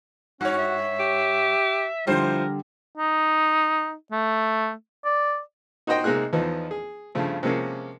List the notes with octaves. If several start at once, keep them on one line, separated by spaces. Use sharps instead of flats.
G2 C#4 F#4 C#5
E5
G4
D3 F3 G3 E4 A#4 C5
D#4
A3
D5
D#4 F#4 C5 D#5 G5 C6
C3 G#3 A#3 D#4 G#4 F#6
E2 F3 B3 D#4
G#4
G2 C#3 F3 A3
C3 F3 G#3 A#3 C#4